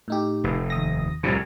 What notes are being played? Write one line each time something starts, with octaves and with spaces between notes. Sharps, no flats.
A2 D#4 G4
F1
D#2 D#6 A#6
C2 A2 C#3 F3 G3